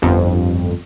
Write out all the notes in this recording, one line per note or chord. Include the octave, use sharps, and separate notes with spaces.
G1 F2